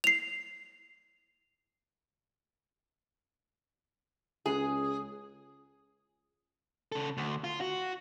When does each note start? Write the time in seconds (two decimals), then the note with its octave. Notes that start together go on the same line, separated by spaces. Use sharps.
0.04 C7 F7
4.46 C#2 G#4
6.92 C#3 A4
7.17 D2
7.44 F4
7.61 F#4